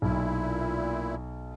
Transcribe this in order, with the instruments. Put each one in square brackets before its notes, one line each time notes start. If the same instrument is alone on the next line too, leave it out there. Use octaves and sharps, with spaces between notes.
[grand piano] B1 [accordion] A#2 E4